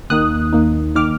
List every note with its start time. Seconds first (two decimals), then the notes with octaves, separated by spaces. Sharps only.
0.10 D#2 D#3 A#3 D#4 D#6 F#6
0.53 D#2 D#3 A#3 D#4
0.95 D#3 A#3 D#4 D6 F6